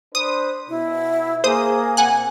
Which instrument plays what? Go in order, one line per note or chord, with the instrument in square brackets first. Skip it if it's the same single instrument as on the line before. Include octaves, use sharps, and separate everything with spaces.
[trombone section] D4 B4 C5 [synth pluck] D#6
[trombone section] B2 [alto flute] E4
[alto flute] A#3 [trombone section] G#4 [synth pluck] C5 D#6
[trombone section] A#2 C4 [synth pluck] F#5 G#5 F#6